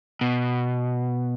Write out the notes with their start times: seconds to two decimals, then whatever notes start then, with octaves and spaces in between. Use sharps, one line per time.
0.21 B2